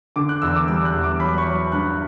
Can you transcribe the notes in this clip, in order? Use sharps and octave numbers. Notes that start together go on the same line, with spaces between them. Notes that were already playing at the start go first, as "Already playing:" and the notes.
D3 D6
F#6
E2 E6
D6
G3 E6
F#6
E2
D6
F#3 B5
C#6
F#3
G2 F#6